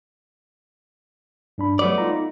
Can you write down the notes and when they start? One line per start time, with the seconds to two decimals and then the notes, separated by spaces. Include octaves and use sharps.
1.58 G2 D4 B5
1.79 F#3 G3 A3 B3 D5
1.98 D#4 F4 A#5